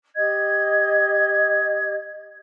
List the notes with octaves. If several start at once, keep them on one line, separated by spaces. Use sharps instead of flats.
G4 D#5 G#6